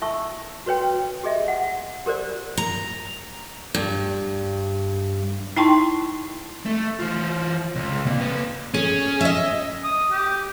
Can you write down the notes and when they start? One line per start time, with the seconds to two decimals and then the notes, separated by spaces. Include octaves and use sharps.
0.01 E4 E5 A5 C#6 E6
0.66 F#4 B4 C#5 G5
1.23 G4 G#4 D#5 E5
1.48 F#5
2.06 G4 A#4 C5 D5
2.57 A#5
3.75 G2
5.56 D#4 E4 G5 A5 C6 C#6
6.66 A3
7.00 E3 F4
7.76 C#2
8.06 C3 A#3
8.20 A#3 B4
8.74 C#4 G#4
9.21 D#5 E5
9.84 D#6
10.12 G4